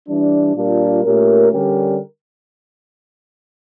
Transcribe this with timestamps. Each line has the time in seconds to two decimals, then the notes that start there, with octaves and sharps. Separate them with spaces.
0.08 E3 G3 D4
0.55 A#2 G3 D4 F4 A#4
1.03 A#2 A3 C#4 G4 A#4
1.51 D3 G3 C#4 G4 A#4